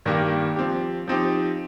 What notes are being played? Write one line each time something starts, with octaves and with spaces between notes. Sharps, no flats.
G2 D#3 A#3 G4
F3 C4 G4
F3 C4 D#4 G4